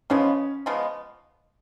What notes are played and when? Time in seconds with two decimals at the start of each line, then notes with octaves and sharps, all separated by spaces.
0.10 C#3 F3 G#3 B3 C#4
0.66 C#3 F3 G#3 B3